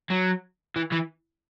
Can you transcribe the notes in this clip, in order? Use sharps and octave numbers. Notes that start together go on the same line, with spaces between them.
F#3
E3
E3